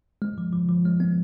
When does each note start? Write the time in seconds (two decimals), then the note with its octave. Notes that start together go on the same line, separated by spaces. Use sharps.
0.22 G#3
0.38 F3
0.53 F3
0.69 F3
0.85 G#3
1.00 B3